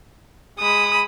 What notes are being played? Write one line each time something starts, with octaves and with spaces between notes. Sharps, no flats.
G#3 B5 D#6